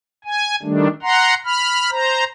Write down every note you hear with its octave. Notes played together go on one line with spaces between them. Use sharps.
G#5
D#3 G3 A3 D4
F#5 A#5 C6
B5 F6
C5 A#5